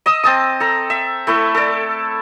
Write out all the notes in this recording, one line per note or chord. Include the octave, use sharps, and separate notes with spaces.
D#5 D#6 E6
C4 A5 D#6
A4 A#5
E5
A3 E4 A4
A4 D5